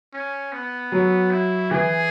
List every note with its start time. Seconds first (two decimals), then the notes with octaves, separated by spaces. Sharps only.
0.13 C#4
0.52 B3
0.92 F#3
1.31 E4
1.71 E3 G#4